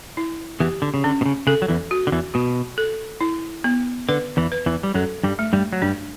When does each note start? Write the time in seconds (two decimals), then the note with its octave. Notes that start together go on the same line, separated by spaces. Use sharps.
0.17 E4
0.60 E2 E3 G4
0.82 D3
0.94 C#3
1.04 D3 C#4
1.21 B2
1.26 C#3
1.47 C#3 A4
1.62 F#3
1.68 E2 E3
1.91 F#4
2.07 D3
2.12 E2 E3
2.34 B2 F#4
2.78 A4
3.21 E4
3.64 B3
4.09 D3 B4
4.37 E2 E3
4.52 B4
4.66 E2 E3
4.83 G3
4.94 F#2 F#3 A4
5.23 G2 G3
5.39 A3
5.53 G2 G3
5.73 F#3
5.82 G2 G3 D4